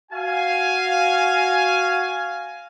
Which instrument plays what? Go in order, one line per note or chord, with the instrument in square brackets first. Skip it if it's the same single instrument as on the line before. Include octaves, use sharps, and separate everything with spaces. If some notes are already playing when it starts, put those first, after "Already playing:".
[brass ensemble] F#4 F5 G#5